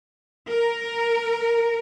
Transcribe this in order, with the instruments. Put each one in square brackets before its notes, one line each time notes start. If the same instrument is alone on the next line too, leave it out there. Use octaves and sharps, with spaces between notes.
[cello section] A#4